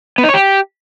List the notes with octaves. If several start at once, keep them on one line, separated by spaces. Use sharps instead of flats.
B3
D#4
C#5
G4